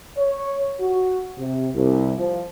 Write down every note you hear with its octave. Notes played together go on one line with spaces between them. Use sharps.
C#5
F#4
C3
C2
F3